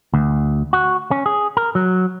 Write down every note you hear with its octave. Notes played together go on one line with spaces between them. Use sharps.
D2
F#4
C#4
G#4
A#4
F#3